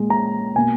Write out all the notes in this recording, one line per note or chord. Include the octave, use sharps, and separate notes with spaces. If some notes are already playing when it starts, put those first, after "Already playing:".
Already playing: A#2 G#3
A#5
B2 A#3 G#5